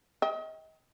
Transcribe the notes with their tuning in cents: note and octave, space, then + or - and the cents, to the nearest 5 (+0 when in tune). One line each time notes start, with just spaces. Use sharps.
D#5 +35 G5 +0